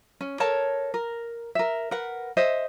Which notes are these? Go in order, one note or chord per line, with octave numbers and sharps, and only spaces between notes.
C#4
A4 A#4 C#5 A5
A#4
A#4 E5
A#4 B4 F#5
C5 D#5 E5